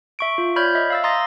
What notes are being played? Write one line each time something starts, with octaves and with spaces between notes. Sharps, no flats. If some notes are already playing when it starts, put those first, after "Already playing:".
E5 C#6 D7
F4
C#5 D5 B5 F6 G6 G#6
D#5 E5
F5 E6 A6
A#5 C6 D#6 A6 A#6